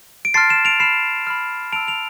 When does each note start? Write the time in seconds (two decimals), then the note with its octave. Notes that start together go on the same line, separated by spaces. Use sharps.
0.25 D7
0.34 A5 C6 F6 A6 C7
0.50 C7 E7
0.65 D7 F7
0.80 B5 F6 C7 E7
1.27 B5 F6
1.73 A5 E6 D7 F7
1.88 D7 F7